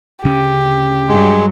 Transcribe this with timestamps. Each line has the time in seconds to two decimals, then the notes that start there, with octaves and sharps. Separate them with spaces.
0.24 D2 C#3 C#4 G4
1.09 G2 F#3 G#3